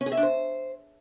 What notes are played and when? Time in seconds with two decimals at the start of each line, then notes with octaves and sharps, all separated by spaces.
0.01 C#4
0.06 G#4
0.12 E5
0.17 D4
0.23 C5